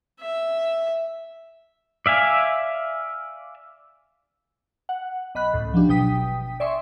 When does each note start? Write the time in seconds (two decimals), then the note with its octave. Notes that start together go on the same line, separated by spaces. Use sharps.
0.20 E5
2.06 D5 E5 F5 G#5
4.89 F#5
5.35 B1 D#5 B5 F#6
5.54 C#2 A2
5.74 F3 F#3 D4 G4
5.88 G#1 B2 G5 D#6 B6
6.60 D5 E5 G#5 C6 C#6